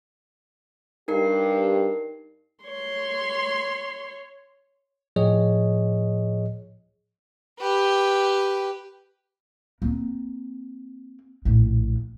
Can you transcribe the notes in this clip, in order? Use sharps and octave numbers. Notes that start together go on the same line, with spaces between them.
G2 D#4 G4 A#4 C7
C#5 C6
A2 F3 G#4 C#5 D#5
G4 B4
A#3 C4
A#1 A2